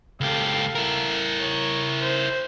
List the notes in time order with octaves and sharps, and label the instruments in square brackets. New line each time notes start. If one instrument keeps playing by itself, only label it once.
[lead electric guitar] C#2 G4 [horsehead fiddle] A4 F5
[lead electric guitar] E4 A#4
[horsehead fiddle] C#5
C5